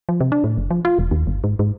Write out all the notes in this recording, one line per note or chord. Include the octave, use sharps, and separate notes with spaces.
F3
C3
D4
A2
F#1
F3
F4
E1
D#2
G1
G#2
G#2